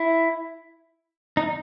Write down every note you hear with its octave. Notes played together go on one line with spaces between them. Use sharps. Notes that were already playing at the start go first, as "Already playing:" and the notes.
Already playing: E4
D#4